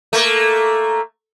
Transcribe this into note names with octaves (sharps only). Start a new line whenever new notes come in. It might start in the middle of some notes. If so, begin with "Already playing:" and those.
A3 A#3